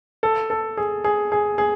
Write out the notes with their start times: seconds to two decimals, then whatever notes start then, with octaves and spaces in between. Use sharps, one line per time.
0.23 A4
0.50 A4
0.77 G#4
1.04 G#4
1.32 G#4
1.58 G#4